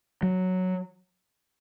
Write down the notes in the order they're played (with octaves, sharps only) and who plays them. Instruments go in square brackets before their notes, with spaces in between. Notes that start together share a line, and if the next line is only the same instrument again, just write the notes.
[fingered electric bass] F#3